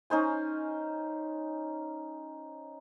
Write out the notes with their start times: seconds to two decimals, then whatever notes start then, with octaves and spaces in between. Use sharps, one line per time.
0.10 C#4 D#4 C5 G#5